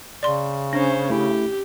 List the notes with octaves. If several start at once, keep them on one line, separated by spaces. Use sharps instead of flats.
C#3 D5 C6
C#4 D4 C5
A3 E4 G4